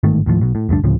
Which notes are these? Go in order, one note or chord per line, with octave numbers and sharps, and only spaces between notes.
G1 G#2 D#3 A3
D#2 A2 C#3 F3
B1 B2
A2
F1 D2 G2 D4
D2 A2 C#3 F3